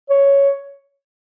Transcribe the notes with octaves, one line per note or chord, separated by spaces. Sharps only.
C#5